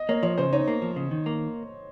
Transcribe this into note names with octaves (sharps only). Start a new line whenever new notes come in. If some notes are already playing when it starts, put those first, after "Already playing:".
Already playing: D#5
A#3 C#5
F3 C#5
C#3 C5
D#4 C#5
A#3
F3
C#3
D#3
A#3